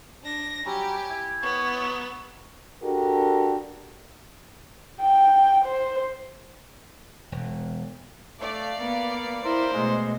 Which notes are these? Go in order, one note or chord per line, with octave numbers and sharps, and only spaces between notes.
D4 A#6
F#3 G3 G4 G#5
E4
B3 C#5
F#3
D4 F#4 G4 A4 A#4
G5
C5
E1
A3 D5 F5
A#3 B3
E4 A#4 C5
B2 G#3 A3